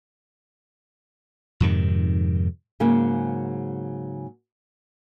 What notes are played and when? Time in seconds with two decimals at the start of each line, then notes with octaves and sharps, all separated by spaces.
1.60 F2 G#2 C3 D#3
2.80 G#2 C#3 F#3 A#3